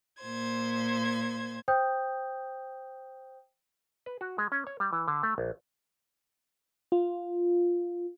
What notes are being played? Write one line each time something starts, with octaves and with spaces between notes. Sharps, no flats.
A#2 C5 G#6
C5 G5 D#6 G6
B4
F#4
G#3
C#4
C#5
G3
E3
D3
A3
A#1
F4